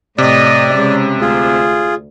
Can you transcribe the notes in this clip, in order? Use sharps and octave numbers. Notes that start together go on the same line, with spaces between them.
A2 C3 D5 D#5
C#3 G#3
D2 F4 G#4